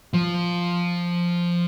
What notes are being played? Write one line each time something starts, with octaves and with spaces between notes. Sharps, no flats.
F3